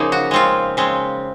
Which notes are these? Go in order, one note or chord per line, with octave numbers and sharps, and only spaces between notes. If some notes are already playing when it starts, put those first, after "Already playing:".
Already playing: C#3 F3 A#3 D#4 G#4 A#4
F#4
C#3 G#3 C4 F4
C#3 G#3 C4